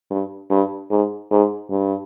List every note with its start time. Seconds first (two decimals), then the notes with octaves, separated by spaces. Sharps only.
0.11 G2
0.50 G2
0.91 G#2
1.31 G#2
1.71 G2